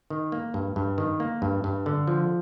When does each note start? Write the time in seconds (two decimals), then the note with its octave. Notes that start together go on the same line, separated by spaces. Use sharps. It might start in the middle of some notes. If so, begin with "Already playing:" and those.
0.10 D#3
0.32 A#3
0.54 G2
0.76 G2
0.98 D#3
1.20 A#3
1.42 G2
1.64 G2
1.86 D3
2.08 F3